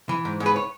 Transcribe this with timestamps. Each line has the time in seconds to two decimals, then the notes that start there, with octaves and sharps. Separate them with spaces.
0.09 E3
0.25 G#2
0.40 G#2
0.46 B4
0.56 C#5